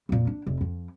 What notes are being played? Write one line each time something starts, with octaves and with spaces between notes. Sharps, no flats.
F2 A#2
D4
F1
F2